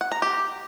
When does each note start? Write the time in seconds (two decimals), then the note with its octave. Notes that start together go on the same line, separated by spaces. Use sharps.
0.01 F#5
0.12 A#5
0.22 G4